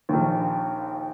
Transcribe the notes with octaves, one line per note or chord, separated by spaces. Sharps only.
A#1 D#2